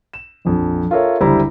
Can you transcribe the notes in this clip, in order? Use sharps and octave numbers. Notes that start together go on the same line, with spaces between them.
E7
A#1 F2
F4 A4 A#4 C#5 E5
F#1 D2 G3 E4 C5 A#5